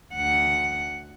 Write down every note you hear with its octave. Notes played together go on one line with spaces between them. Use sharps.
D2 F#5